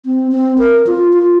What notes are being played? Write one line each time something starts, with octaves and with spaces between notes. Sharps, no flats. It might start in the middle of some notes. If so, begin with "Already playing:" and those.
C4
C4
A#4
F4
F4